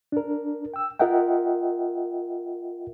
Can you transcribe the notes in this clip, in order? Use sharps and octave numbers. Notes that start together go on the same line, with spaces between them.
D4 A#4
G5 E6
F4 A#4 D#5 E5 F#5 G5